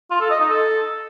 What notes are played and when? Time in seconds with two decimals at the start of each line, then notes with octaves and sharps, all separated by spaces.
0.11 F4
0.20 A4
0.30 D#5
0.40 D#4
0.50 A4